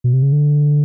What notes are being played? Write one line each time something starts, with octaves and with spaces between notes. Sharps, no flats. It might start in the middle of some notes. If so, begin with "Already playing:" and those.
B2
C3
C#3
D3